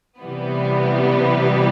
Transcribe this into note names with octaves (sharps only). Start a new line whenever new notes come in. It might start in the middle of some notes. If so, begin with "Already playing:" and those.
C3 E3 G3 B3